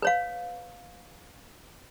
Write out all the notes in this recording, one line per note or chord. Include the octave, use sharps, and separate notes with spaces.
B4 C#5 F5